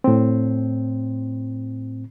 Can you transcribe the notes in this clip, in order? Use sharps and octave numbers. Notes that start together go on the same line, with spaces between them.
A2 C4